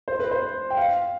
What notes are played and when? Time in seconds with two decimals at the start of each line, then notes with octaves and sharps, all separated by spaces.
0.08 C5
0.20 B4
0.31 C5
0.71 G5
0.77 F5